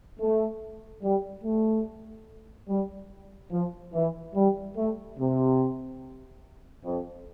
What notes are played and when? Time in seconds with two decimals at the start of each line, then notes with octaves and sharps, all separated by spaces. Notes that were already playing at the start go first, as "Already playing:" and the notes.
0.20 A3
1.03 G3
1.44 A3
2.69 G3
3.52 F3
3.94 E3
4.36 G3
4.77 A3
5.19 C3
6.85 F2